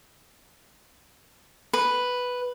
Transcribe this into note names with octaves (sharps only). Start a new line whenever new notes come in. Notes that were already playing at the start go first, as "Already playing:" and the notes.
B4